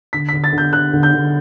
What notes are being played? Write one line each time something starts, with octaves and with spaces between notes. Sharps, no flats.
D3 B6
D3 B6
A6
D3
G6
D3 F#6
D3
G6
D3